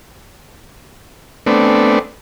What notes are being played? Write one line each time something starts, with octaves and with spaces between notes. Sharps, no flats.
A3 B3 C4 D4